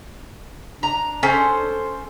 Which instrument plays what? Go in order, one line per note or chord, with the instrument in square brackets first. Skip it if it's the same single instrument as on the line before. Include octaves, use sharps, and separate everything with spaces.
[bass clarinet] D4 [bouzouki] A#5
[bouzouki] C#4 A4 C5